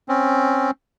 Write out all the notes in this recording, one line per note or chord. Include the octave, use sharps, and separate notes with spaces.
C4 C#4